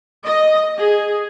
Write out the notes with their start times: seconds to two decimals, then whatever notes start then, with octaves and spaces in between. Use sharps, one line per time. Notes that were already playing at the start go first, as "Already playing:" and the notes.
0.24 D#5
0.77 G#4